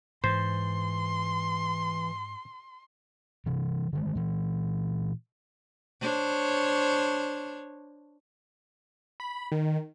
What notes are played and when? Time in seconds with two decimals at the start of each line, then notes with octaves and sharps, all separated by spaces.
0.24 G#2 E3 C5 C6
3.46 C3 E3
3.93 D3 D#3 G#3
4.15 A#2 E3
6.00 D4 C5 C#5
9.20 B5
9.52 D#3